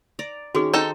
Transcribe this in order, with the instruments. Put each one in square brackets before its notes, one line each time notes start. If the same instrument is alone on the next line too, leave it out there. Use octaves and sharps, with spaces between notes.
[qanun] D5 A#5
[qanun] D#3 C#4 C#5 [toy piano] F#4 G#4
[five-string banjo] D#4 A4 G5 [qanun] C5 [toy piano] A#5